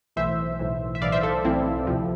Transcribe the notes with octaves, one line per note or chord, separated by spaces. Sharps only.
B1 A2 E3 C5 E5
B1 A2 E3
E5
B1 A2 E3 D5 F5
C5 E5
A4 C5
B1 A2 E3 C4 E4
D2 C3 F3